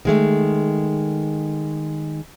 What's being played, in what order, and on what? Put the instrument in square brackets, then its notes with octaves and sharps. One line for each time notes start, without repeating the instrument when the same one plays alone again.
[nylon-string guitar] D#3 G#3 A3